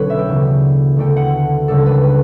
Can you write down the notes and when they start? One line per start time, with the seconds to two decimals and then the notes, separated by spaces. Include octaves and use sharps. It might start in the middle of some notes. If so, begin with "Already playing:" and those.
Already playing: B1 D3 C#4 B4 C#5
0.10 E5
0.19 G5
0.28 D2 C#3 E3 B3 D4
0.97 D2 D3 A3 D4 G5
1.16 F#5
1.68 C#2 C#3 G3 D4 A4
1.86 B4
2.03 B4